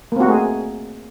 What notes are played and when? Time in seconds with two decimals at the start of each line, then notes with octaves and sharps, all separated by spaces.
0.12 A#3
0.16 C4
0.20 F#4
0.25 A3
0.29 G#4